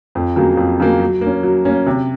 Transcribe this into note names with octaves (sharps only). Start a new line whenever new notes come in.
F2
C#3 F#3 A#3
F2
C#3 F#3 A#3
F#3
A#3 C#4
F#3
A#3 C#4
C3